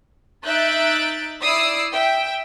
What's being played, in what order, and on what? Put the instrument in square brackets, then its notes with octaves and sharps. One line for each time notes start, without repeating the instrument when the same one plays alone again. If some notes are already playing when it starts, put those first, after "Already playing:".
[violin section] D#4 E5 F#6 G6 A6 D7
E4 D5 D#6 E6 C7 D7
E5 G5